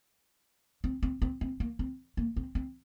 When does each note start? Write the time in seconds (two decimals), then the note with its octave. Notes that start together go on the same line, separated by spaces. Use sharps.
0.84 C4
1.03 C4
1.22 C4
1.41 C4
1.60 A#3
1.79 C4
2.17 A#3
2.36 C4
2.55 C4